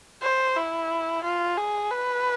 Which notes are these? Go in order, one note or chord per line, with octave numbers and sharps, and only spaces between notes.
C5
E4
F4
G#4
B4